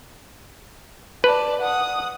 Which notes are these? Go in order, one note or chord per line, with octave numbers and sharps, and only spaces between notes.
B4 D5 A5
F#5 D#6